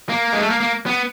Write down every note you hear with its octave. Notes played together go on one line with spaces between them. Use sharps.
A#3
G#3
A3
A#3
A#3
B3